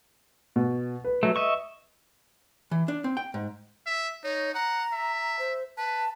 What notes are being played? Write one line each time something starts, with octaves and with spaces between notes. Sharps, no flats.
B2
B4
F#3 A3
D#5 E5 C#6
E3
D4
C4
G5
G#2
E5
D#4 C#5
F#5 A#5
E5
C5
B4 A5